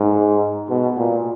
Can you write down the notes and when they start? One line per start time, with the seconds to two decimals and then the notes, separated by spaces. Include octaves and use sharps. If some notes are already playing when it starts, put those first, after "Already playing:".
Already playing: G#2
0.69 B2
0.97 A#2